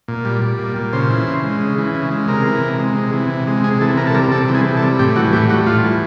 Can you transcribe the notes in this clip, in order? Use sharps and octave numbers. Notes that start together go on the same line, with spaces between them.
A#2
G3
G3
A#2
A#2
C#3 C5
E3
C#3
G#3
C#3
E3
C#3
G#3
C3 A#4
E3
C3
G#3
C3
E3
C3
G#3
C3 G#4
E3 A4
C3 A#4
A4
G3 A#4
C3 A4
E3
G#4
C3
A4
G3
A2 G4
E3 F#4
A2 G4
G3 F#4
A2 F4
E3